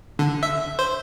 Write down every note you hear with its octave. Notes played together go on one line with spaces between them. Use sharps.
D3
E5
C5